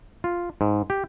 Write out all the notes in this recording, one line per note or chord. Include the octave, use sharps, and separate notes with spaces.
F4
G#2
G4